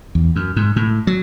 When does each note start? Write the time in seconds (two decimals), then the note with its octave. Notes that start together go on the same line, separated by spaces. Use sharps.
0.15 E2
0.36 F#2
0.56 G#2
0.76 A2
1.07 F#3